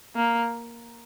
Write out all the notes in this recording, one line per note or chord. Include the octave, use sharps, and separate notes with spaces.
A#3